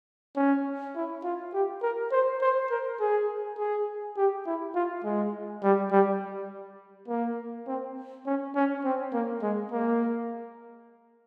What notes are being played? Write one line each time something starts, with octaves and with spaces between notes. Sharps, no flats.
C#4
E4
F4
G4
A#4
C5
C5
A#4
G#4
G#4
G4
E4
F4
G#3
G3
G3
A#3
C4
C#4
C#4
C4
A#3
G#3
A#3